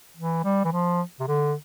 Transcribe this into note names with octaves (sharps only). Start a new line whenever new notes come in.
E3
G3
E3
F3
C3
D3